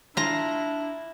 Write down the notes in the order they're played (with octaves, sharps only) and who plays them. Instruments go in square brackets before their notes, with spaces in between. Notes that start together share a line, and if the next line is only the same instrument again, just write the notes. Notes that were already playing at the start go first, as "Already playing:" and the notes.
[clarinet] D4 [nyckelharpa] E4 [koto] F4 A#5